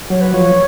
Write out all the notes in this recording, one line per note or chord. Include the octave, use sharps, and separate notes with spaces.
F#3 C#5
B4
F3 C#5